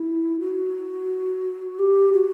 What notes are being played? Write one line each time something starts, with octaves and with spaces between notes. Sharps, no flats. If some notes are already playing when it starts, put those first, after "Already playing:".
Already playing: E4
F#4
G4
F#4